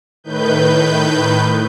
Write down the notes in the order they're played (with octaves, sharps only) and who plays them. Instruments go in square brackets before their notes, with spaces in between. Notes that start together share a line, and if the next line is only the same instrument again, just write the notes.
[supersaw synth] A2 D#3 B4 G6